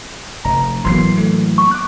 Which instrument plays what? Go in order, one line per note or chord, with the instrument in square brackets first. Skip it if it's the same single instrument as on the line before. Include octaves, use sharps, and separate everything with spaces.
[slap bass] F1 [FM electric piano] A#5
[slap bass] A2 E3 [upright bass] F#3 A#3 [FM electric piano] C6 C7
[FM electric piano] A3
[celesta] C#6
[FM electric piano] D6 F#6